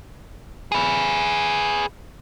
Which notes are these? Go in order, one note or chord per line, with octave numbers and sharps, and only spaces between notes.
G#4 B4